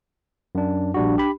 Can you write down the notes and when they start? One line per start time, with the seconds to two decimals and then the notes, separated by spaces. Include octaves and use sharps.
0.55 F#2 D4
0.94 A#1 G3 D4 F#4
1.18 G4 B5